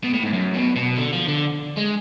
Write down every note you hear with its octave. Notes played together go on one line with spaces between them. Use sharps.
B2
A2
G#2
F#2
B2
B2
D3
F3
D3
G#3